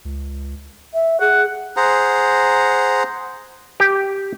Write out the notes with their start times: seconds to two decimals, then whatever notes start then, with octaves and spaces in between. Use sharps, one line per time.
0.05 C#2
0.94 E5
1.21 G#4 F#5
1.77 G#4 C5 F#5 A#5
3.80 G4